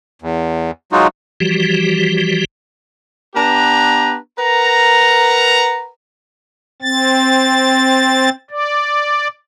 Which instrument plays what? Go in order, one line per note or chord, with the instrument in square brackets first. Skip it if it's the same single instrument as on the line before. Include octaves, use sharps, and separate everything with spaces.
[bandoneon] E2
F#3 G#3 D#4 F4 F#4
[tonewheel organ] E3 F3 G3 F#4 G4
[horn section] B3 D4 G4 B4 A#5
A#4 B4 F#5 A#5
[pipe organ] C4 A6
D5